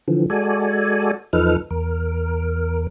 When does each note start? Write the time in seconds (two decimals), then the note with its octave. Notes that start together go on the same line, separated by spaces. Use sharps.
0.08 D3 E3 F3
0.30 G#3 F#4 A4 D5 G#5
1.33 E2 F3 D#4 A4 B4 F6
1.71 E2 A#4